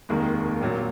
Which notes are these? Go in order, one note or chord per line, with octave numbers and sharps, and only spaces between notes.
F1 D#2 D#3 G#3 A#3
A#1 A#2 F#3